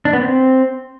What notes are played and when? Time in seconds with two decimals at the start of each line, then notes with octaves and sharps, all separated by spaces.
0.05 D4
0.13 B3
0.21 C4